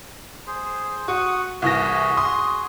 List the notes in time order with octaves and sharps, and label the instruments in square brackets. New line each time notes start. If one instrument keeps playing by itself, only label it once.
[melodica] G#4 C5
[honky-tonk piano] F#4 [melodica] C#6 D#6
[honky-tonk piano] C2 E3 A#6 [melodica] F#4 G#4
[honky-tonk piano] C6 D#6